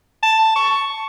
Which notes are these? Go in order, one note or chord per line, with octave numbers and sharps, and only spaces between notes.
A5
C#6